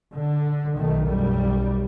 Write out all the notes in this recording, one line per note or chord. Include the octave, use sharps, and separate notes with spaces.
D3
B1 D#3 A3
B1 F#2 G3